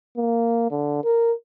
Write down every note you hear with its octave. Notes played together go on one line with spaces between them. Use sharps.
A#3
D3
A#4